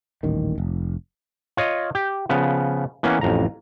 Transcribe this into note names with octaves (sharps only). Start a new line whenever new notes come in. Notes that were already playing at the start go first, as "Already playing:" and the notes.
D#1 A1 D#3
F1
F4 C#5 D#5
G4
C#3 F3 B3
E3 A#3 B3 C#4
A1 F2 A#5